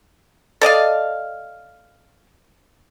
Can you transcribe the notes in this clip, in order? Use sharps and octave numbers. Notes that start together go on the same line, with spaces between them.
A4 D5 D#5 F5